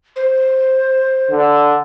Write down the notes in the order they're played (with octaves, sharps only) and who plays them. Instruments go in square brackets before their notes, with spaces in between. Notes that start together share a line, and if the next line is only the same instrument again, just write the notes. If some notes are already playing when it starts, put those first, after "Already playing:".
[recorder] C5
[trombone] D3